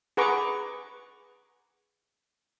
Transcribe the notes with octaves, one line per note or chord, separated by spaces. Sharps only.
G#4 B4 F#5 A#5 C#6 D6